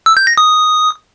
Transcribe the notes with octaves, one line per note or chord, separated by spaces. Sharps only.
E6
G6
A#6
D#6